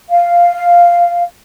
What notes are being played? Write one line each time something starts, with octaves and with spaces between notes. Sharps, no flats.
F5